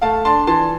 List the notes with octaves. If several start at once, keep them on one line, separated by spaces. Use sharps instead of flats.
A3 F5 A5
D4 A5 C6
E3 A5 C6